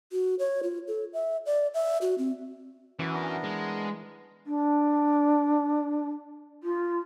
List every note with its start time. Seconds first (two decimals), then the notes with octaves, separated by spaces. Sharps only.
0.12 F#4
0.39 C#5
0.63 F4
0.88 A4
1.13 E5
1.46 D5
1.74 E5
2.02 F#4
2.18 C4
2.99 E3 C#4 F#4 D6
3.13 B3 D4 A#4
3.44 G#3
4.44 D4
6.63 F4